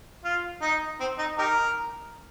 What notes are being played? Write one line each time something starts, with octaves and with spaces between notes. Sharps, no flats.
F4
D#4
C4
D#4
D#4 G4 A#4